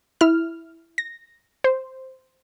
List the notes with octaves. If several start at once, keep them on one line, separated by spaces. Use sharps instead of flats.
E4 F6
A#6
C5